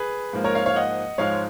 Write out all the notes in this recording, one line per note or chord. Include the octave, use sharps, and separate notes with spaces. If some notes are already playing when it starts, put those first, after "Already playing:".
Already playing: G#4 B4
G#2 F3 A#3
A#4 C#5
C#5 F5
C#5 F5
D#5 F#5
G#2 F3 G#3 C#5 F5